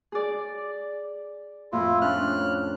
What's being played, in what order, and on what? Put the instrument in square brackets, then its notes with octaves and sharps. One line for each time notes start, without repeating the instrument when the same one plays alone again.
[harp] G#4 D5
[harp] F2 A2 [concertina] E4 F4
[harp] C#4 D4 [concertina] F6 F#6